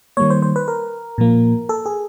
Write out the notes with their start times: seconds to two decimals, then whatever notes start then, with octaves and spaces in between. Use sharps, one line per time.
0.17 D#3 G3 A#3 C#5
0.30 C5
0.42 C5
0.56 B4
0.68 A#4
1.18 A#2 F3 A#3
1.69 A4
1.86 G#4